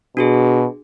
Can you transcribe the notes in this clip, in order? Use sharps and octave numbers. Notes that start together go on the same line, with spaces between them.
B2 D4 F#4 G#4